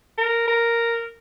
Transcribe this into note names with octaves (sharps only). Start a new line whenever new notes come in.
A#4
A#4